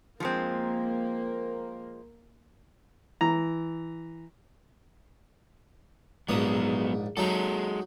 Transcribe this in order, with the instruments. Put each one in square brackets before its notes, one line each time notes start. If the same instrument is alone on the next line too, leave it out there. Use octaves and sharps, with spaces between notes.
[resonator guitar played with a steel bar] F3 G#3 C4 [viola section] A#3
[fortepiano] E3 A#5
[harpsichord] A#1 G#2 D#6 [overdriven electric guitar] F#3 B3
[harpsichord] F#3 D#4 [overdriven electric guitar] G#3 A4